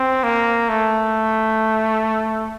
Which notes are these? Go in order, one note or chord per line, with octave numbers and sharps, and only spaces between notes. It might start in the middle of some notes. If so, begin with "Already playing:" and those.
Already playing: C4
A#3
A3